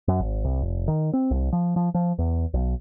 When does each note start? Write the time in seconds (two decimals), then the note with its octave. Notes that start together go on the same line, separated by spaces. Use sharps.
0.08 F#2
0.20 G#1
0.44 C2
0.62 F1
0.88 D#3
1.13 C4
1.31 C2
1.53 F3
1.76 F3
1.94 F3
2.19 E2
2.54 B1